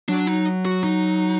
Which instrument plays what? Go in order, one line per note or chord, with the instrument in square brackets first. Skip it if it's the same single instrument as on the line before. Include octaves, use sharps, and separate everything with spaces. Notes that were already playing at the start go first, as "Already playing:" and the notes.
[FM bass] F#3 [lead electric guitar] D4
[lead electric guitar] D#4
F#4
D#4